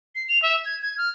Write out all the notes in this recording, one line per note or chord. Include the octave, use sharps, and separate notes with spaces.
C7
F7
E5
G#6
G#6
F6